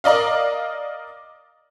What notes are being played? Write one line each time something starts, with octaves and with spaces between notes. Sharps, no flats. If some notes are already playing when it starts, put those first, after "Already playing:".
A#4 D5 D#5 F5